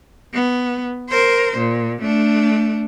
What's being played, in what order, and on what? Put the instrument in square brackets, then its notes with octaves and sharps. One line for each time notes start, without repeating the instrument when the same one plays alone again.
[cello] B3
A#4 C5
A#2
A3 D4